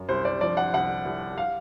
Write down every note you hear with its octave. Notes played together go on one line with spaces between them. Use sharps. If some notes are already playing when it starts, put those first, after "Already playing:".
Already playing: F#2
C2 C5
D5
F3 D5
F#5
C2 F#5
C2
F5